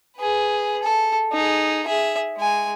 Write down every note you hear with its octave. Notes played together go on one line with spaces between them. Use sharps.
G#4 B4
A4
D#4 G#4
G#4 E5
G#3 G#5